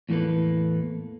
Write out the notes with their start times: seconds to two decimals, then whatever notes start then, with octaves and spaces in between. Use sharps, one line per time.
0.09 E2 A2 E3 A#3 A4 B4